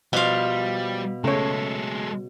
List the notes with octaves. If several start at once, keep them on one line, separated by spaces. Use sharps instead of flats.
B2 F3 G3 F4 F5
C#3 G#3 A3 A4 C#5